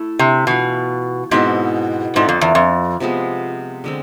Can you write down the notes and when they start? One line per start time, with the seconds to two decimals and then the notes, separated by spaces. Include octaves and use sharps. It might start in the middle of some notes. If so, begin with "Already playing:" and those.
Already playing: A3 E4 A4
0.19 C3
0.47 B2 E3 B3 F4
1.31 G#2 B2 G#3 C4 E4
2.16 G#2 C4 F4 A4 D5
2.29 F2
2.41 E2
2.55 F2
3.00 C3 F3 G#3 B3
3.84 D3 G#3 C4